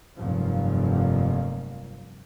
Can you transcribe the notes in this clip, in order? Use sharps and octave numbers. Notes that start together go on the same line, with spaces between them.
F1 G2 F3 F#3 A#3